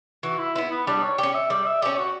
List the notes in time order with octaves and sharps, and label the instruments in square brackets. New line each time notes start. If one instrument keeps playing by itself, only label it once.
[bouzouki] E3 [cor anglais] F#4
[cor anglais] E4
[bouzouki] B3 E4
[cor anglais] B3
[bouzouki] G3 [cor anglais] D4
[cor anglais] C#5
[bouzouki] C#4 G4 [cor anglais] D5
[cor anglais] E5
[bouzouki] G3 [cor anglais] D5
[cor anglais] E5
[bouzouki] C#4 G4 [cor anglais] D5
[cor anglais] F#4